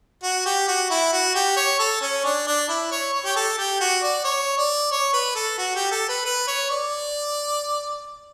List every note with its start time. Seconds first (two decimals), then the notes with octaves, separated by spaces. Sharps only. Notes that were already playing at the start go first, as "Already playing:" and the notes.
0.23 F#4
0.46 G4
0.68 F#4
0.90 E4
1.13 F#4
1.35 G4
1.57 C#5
1.79 A4
2.01 C#4
2.25 D4
2.47 D4
2.69 E4
2.91 C#5
3.13 C#5
3.25 G4
3.36 A4
3.58 G4
3.81 F#4
4.03 D5
4.25 C#5
4.58 D5
4.92 C#5
5.13 B4
5.36 A4
5.58 F#4
5.75 G4
5.91 A4
6.09 B4
6.25 B4
6.47 C#5
6.70 D5